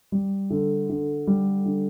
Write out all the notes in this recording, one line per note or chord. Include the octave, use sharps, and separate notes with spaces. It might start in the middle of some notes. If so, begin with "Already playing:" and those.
G3
D3
D3
G3
D3